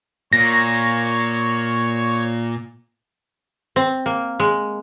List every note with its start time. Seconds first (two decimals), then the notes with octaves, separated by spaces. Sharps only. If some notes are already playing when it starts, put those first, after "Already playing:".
0.33 A#2 C#5 A#6
3.76 C4
4.06 A#3
4.40 G#3